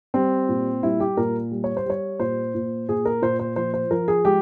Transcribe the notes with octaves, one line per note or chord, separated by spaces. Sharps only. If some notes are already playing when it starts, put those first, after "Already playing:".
G3 C4
A#2
G3 E4
G4
A#2 A#4
G3
C#5
C5
G3 C#5
A#2 C5
A#2
A#2 G#4
A#4
A#2 C5
C5
F3 C5
C5
F3 A#4
G#4
G#3 G4